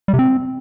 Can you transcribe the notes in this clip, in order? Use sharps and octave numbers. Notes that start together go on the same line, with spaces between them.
G3
C3
C4